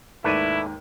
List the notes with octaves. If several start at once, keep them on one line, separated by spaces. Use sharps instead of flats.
D#2 G#2 A3 E4 B4 D5 D#7